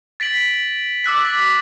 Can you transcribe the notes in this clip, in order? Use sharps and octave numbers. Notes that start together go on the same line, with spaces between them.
A6 B6 D7 F#7
D6 E6 F#6 B6
A6 B6